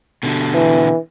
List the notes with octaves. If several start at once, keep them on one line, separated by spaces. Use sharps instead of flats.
B2 D3
E3